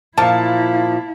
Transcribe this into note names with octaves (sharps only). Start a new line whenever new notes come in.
A#2 F3 E4 F5 A5